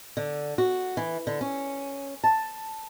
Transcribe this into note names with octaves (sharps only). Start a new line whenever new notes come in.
D3
F#4
E3
D3
C#4
A5